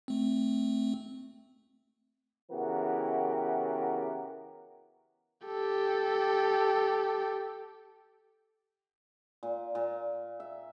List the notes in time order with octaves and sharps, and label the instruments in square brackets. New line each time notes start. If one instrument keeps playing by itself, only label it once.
[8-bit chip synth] A3 C4
[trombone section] C#3 E3 B3 F#4 G4 A#4
[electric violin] G4 A4
[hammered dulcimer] A#2
A#2
E5